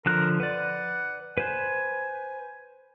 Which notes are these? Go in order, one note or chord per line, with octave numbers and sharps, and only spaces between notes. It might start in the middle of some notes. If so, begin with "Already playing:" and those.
D3 F3 A#4 F#6
B4 D5 F#5
B4 C5 G#5